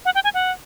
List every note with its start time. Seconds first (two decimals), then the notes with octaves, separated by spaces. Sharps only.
0.05 F#5
0.15 G5
0.24 G#5
0.34 F#5